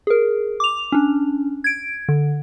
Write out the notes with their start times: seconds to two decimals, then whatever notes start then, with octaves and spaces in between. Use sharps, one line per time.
0.07 G#4 A#4
0.60 D6 F7
0.92 C#4 D4
1.64 G#6 D7
2.09 D3